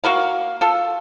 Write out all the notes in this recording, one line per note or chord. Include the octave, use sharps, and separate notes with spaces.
A#3 F#4 A#4 F5
F4 A4